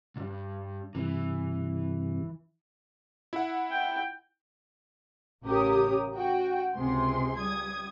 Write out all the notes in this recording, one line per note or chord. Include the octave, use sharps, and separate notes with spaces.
C2 G2
G2 C3 E3
E4 F#5
G5
A1 C#3 G4 A#4 C#5 D#6
F#4 G5
C#2 C3 G#4 C6
G3 D#6 G#6